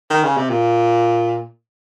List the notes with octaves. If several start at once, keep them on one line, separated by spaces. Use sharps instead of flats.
D#3
C#3
C3
A#2